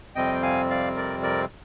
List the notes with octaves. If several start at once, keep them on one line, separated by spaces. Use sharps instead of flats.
F2 C3 G3 C4 D#5 G5
G5
F5 G#5
D5 F5
A#4 D5
A#4 D5